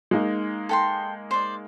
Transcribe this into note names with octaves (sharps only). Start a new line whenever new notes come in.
G#3 A#3 D#4
A4 G5 C6
C5 D5